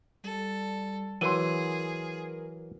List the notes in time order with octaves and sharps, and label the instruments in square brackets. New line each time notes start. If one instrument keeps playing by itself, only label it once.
[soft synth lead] G3 [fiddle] A4
[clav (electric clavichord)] E3 F#3 [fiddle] G#4 [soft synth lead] A#4 [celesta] C6 D#7